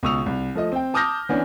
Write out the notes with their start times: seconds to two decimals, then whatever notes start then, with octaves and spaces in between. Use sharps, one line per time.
0.03 C#2 B2 C#6 D#6 E6 F7
0.26 C2
0.55 F3 A3 D#5
0.72 C4 G5
0.94 A5 D6 D#6 F6 G6 A#6
1.29 E3 B3 C#4 D4